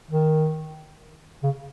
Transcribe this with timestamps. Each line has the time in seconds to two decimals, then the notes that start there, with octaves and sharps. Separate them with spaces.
0.10 D#3
1.43 C#3